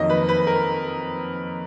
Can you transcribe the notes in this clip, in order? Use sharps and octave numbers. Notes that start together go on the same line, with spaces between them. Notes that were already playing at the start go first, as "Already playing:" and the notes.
Already playing: F2 D#3 F#3 A#3 D#5
B4
B4
A#4